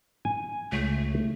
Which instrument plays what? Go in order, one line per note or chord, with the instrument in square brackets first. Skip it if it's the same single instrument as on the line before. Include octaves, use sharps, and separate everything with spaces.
[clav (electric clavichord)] G#5
[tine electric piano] C#2 [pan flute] A3